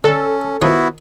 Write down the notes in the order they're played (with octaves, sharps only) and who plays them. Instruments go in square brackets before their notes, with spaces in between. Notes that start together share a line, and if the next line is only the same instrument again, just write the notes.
[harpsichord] D3 [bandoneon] C#4 [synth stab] A4
[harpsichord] D#3 F3 D#4 [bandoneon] B3 E4 F#4